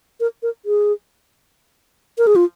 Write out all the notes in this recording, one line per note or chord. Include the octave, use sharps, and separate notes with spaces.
A#4
A#4
G#4
A#4
G#4
F4